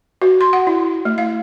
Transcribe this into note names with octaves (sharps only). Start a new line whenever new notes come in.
F#4
C6
F#5
E4
A3
F5